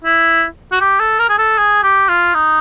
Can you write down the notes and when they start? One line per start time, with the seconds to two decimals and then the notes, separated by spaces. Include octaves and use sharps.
0.04 E4
0.72 F#4
0.81 G4
1.00 A4
1.19 A#4
1.29 G#4
1.38 A4
1.58 G#4
1.83 G4
2.09 F4
2.34 D#4